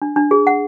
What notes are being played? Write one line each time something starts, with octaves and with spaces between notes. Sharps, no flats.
D4
D4
G#4
F#5